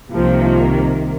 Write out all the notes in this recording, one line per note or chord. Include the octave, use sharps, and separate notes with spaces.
C2 C3 D#3 F3 A#3